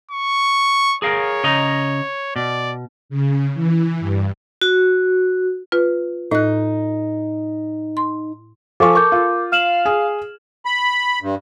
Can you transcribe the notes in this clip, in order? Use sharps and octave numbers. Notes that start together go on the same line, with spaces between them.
C#6
G#4 A#4 C#5 F5
C#3 D#5 A#5
B2 D5
C#3
E3
G2
F#4
F4 B4
A2 D#4 F#6
C6
F3 A4 F5 G#5 C#6 D6
A#4 C#6 D6 G6
F4
F5 F6 E7 F#7
G#4
B5
G2